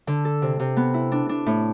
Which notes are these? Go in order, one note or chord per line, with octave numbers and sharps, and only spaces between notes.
D3
A4
C3
C3
B3
E4
D4
D4
A2